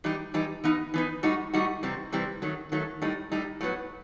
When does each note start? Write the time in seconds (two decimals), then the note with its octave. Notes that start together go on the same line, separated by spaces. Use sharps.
0.04 E3 G3 D#4 G4
0.34 E3 G3 D#4 G4
0.64 E3 B3 D#4
0.94 E3 B3 D#4
1.23 A2 G3 D#4 F#4
1.53 A2 G3 D#4 F#4
1.83 C3 E3 G3 C4
2.12 C3 E3 G3 C4
2.42 D#3 F#3 A3
2.72 D#3 F#3 A3
3.02 A2 G3 D#4
3.31 A2 G3 D#4
3.61 A2 F#3 B3